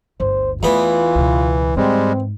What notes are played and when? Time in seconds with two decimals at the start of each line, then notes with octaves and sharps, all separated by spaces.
0.20 G1 D2 C5
0.63 E2 E3 A3 B3 F4 B5
1.15 C#2 B2
1.77 G#2 G3 G#3 C4